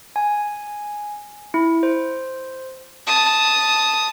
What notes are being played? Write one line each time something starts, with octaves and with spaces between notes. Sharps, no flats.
G#5
E4
C5
A5 D#6